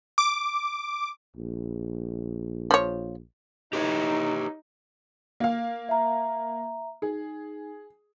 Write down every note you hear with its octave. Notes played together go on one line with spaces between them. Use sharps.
D6
A#1
F3 C#5
D#4 G4 B4 C#5
A#3 F5
E5 A#5
D#4 G#4